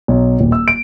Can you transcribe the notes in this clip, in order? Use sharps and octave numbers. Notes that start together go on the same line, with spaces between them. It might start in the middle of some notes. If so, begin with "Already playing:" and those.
B1
D#1
E6
D7